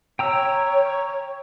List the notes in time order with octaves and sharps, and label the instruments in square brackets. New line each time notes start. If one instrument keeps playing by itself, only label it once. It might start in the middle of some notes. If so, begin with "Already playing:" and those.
[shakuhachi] C#5 [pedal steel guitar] G5 A#5 E6